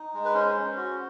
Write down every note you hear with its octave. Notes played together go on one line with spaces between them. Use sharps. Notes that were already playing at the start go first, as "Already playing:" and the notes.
Already playing: D#4
G#3
B4
C#4 C5
C#4
F#4